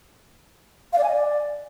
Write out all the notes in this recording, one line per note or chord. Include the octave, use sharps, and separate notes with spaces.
F5
D5
G#5
D#5
D5